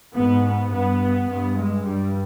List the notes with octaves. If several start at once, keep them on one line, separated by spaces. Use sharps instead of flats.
G#2 B3
B3
G2 B3
G2 B3
G#3
G2 G3